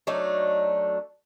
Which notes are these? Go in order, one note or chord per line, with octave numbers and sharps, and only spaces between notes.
F#3 A3 D4 D#4